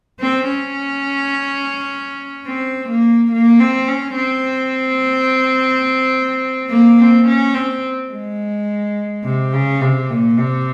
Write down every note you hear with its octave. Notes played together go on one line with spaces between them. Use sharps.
C4
C#4
C4
A#3
A#3
C4
C#4
C4
A#3
C4
C#4
C4
G#3
C3
C#3
C3
A#2
C3